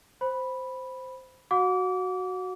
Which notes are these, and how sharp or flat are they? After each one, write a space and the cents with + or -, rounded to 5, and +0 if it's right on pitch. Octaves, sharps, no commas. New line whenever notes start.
C5 -5 B5 -5
F#4 +0 F#5 -35 D6 -30